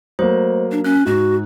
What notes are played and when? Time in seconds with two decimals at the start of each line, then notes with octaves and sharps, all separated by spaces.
0.19 F#3 A3 A#3 C5
0.71 D4
0.84 C#4 F#6
1.07 G#2 F#4